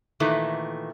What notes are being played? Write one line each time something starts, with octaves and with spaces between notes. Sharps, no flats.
A#2 D#3 E3 A3